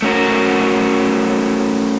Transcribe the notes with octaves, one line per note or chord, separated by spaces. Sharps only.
A3 C#4 F#4 A#4